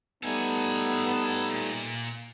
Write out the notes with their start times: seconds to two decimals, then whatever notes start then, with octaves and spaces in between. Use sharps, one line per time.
0.23 G3 A3 B3 D#4 A4 G#5
1.51 A#2